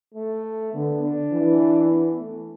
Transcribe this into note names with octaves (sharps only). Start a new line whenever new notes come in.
A3
D3 B3
D4
E3
B3
A3